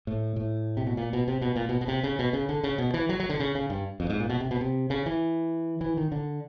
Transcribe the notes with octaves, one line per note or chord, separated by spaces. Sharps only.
A2
A2
C3
B2
A#2
B2
C3
B2
A#2
B2
B2
C3
C#3
B2
C#3
D3
C#3
B2
E3
F#3
F#3
D3
C#3
C#3
G2
F2
G#2
A#2
B2
C3
B2
C3
C#3
E3
E3
D#3
D3